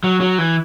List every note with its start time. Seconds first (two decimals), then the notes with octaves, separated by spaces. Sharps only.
0.04 F#3
0.21 F#3
0.38 E3